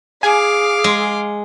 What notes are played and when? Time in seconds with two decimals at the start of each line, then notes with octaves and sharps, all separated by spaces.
0.23 G#4 F5 G#5 D6
0.84 G#3